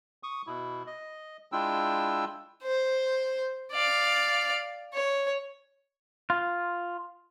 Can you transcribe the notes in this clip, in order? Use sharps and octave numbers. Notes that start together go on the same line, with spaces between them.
C#6 D#6
B2 E4
D#5
G#3 D4 E4 F4 G5 E6
C5
D5 F5
C#5
F4